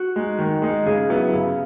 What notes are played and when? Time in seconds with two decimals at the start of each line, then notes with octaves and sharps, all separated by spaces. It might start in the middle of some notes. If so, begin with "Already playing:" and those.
Already playing: F#4
0.16 G#3 D#4
0.39 D#3
0.62 G#3 D#4
0.86 C#3 G#4
1.09 F#3 B3 E4
1.34 C#3